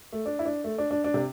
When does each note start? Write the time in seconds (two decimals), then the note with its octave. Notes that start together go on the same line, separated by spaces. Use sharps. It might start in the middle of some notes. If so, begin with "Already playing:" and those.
0.12 A3
0.26 D4
0.39 E4
0.45 D4
0.64 A3
0.78 D4
0.91 D4
1.04 D4
1.14 C3